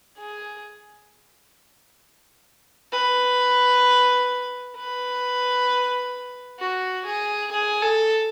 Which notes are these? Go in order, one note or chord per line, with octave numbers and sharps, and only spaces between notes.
G#4
B4
B4
F#4
G#4
G#4
A4